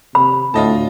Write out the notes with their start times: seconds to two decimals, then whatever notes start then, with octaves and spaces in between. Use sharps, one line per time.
0.15 C3 B5
0.54 D2 A2 F4 D#5 A5